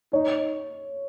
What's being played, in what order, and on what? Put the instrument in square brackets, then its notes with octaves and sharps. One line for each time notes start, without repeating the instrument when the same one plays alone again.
[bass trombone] D#4 [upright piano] C#5